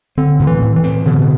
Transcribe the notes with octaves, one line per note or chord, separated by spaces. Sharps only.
D3 C4
A2
E3
A2
E3
C4
B2 D3